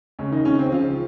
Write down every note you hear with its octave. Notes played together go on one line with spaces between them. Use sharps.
C#2 C#3 C#4
D#3 D#4
C#2 C#3 C#4
C4
C#3 F3 F4